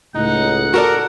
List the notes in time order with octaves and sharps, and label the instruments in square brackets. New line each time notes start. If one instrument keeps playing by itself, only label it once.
[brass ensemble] C#2 A2 [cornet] D#4 [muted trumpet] F#5
[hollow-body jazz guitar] F#4 A4 D5 [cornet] A#4